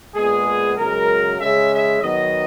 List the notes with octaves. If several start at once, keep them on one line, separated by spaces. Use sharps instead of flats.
A#2 G#3 B3 G#4
F#2 C#3 G#3 A#4
C#3 G#3 C#4 E5
E5
D#3 F#3 B3 D#5